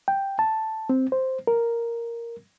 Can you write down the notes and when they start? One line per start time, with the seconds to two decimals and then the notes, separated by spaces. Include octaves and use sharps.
0.08 G5
0.39 A5
0.89 C4
1.12 C5
1.47 A#4